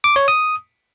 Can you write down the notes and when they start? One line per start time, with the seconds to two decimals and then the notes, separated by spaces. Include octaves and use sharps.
0.04 D6
0.16 C#5
0.28 D#6